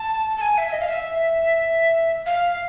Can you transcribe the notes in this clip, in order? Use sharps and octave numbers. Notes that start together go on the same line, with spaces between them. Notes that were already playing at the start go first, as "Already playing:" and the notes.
Already playing: A5
A5
G#5
E5
E5
D#5
F5
E5
F5